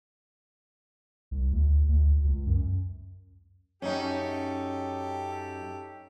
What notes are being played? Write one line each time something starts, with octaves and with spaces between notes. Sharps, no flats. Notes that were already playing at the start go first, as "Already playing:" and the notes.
C2
D2
D2
C#2
F#2
F#2 C#4 D#4 G4 A4